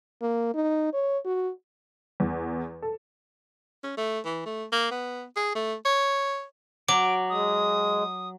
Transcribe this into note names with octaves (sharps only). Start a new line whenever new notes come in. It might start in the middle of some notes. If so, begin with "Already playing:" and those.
A#3
D#4
C#5
F#4
E2
A4
C#4
A3
E3
A3
A#3
B3
G#4
A3
C#5
F#3 D6 D7
G#3 D#6